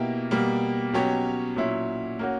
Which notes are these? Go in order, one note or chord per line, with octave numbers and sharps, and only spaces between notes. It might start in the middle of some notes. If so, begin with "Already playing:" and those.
Already playing: B2 A#3 E4 G4
B2 G3 A#3
B2 F#3 C#4 G4 C#5
A#2 F#3 C#4 E4
A#3 C#4 F#4